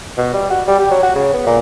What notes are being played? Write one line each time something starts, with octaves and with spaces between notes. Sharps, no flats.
B2
G3
F#4
G3
G4
F#3
F#4
C#3
B3
A#2